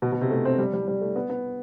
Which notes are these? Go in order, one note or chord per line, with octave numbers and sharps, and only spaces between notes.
B2
B2
C3
A3
C4
G3
G3
G3
A3
B3
B3